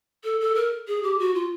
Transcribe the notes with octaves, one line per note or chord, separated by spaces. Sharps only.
A4
A4
A#4
G#4
G4
F#4
F4